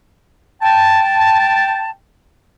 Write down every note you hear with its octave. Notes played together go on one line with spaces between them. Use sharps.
G5 A5